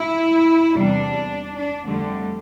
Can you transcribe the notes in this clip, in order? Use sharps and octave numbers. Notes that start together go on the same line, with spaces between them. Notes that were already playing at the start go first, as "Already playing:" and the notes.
Already playing: E4
E2 C3 G3 D4
D4
F2 D3 G3 A3